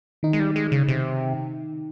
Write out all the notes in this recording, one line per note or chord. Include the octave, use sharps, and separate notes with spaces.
D#3 D#4
G#3
G3
G#3
C#3
C3